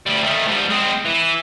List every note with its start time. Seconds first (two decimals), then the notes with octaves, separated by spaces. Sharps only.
0.06 D2 G3
0.24 D#3 A3
0.47 G#2 G3
0.70 G#3 C4
1.05 E3